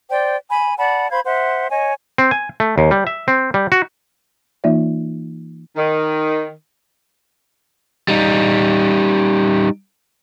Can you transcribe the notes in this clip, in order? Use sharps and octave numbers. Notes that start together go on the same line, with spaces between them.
C5 D5 G5
G#5 B5
D5 F#5 A5 B5
C5 F5 B5 G#6
C5 E5 F#5
C#5 D#5 G#5
C4
G#5
A3
D#2
G3
E5
C4
G3
F#4
E3 A#3 D#4 F4 D5 E5
D#3
G3 D#4